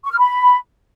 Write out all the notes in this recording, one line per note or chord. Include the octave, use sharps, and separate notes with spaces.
C#6
F6
B5